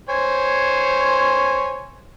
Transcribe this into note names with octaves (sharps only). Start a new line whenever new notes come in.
C5 C#5 G#5